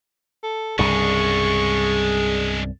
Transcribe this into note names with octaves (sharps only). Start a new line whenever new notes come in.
A4
C2 G2 C#3 G#3 D4 G#4 C#6